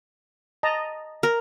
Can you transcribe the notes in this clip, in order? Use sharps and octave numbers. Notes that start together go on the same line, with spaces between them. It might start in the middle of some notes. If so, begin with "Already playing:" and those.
D#5 A5 A#5
A#4